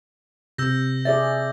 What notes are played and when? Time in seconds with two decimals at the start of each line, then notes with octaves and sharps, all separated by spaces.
0.58 C3 E6 G6 A#6
1.05 G#4 D5 E5 A6